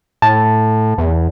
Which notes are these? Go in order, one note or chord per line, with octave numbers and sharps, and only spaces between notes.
A2 A5
E2